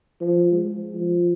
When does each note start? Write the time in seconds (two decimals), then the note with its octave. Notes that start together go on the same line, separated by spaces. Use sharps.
0.21 F3
0.52 G#3
0.93 F3